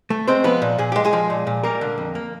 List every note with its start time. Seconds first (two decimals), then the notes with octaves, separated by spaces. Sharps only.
0.10 A3
0.28 G#3 C4 C5
0.44 F3 B3 B4
0.62 A#2
0.78 A#2 G#4
0.92 G#3 G4
1.05 G#3 G#4
1.13 F3
1.30 A#2
1.47 A#2
1.63 G3 A#3 A#4
1.81 D3
1.98 F2
2.15 A#3